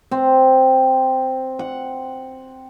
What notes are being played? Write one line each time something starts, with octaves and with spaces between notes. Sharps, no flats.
C4
F#5